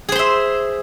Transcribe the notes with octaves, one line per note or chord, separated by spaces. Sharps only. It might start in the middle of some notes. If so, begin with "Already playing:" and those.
G#4 C5 E5 C6